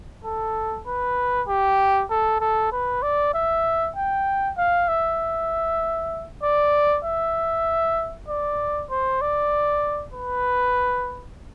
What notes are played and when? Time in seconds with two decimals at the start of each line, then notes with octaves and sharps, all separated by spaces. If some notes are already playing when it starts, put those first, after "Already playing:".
0.25 A4
0.87 B4
1.48 G4
2.11 A4
2.41 A4
2.72 B4
3.03 D5
3.34 E5
3.96 G5
4.58 F5
4.88 E5
6.43 D5
7.05 E5
8.29 D5
8.90 C5
9.21 D5
10.14 B4